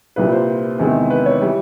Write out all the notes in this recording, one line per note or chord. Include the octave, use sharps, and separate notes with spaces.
C2 A#2 G3 B4
C5
E2 C3 D#3 G#3
B4
C#5
E3 G3